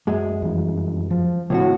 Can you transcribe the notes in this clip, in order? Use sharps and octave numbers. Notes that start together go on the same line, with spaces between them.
F#2 G#3
F2 E3 G3
F3
D#1 C#2 A2 C4 F#4